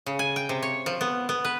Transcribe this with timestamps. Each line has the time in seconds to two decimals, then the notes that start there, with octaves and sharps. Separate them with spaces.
0.06 C#3
0.19 G#5
0.36 G5
0.49 C3
0.62 C#5
0.86 F3
1.01 B3
1.29 B3
1.45 B4